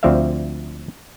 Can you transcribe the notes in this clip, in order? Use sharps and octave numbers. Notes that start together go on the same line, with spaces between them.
D2 F3 C4 D5 E5 F5